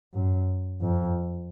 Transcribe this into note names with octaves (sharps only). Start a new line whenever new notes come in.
F#2
F2